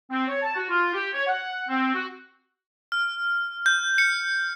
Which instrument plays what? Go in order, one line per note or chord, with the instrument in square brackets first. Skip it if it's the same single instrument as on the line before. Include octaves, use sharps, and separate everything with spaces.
[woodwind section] C4
C#5
A5
F#4
F4
G4
C#5
F#5
C4
F#4
[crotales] F6
G6
C#7